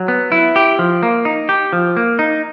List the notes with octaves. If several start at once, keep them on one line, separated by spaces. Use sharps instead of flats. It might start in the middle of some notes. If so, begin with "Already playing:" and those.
Already playing: F#3
B3
E4
G4
F3
A#3
D#4
G4
F3
A#3
D#4